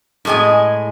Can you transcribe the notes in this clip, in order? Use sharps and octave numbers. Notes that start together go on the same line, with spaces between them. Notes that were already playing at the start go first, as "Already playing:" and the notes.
A2 G#3 G#4 D#5 G#5